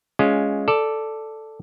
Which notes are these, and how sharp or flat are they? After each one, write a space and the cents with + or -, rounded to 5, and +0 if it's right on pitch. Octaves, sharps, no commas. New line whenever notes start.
G#3 +0 C#4 +10 F4 +0
A4 +0 D5 +0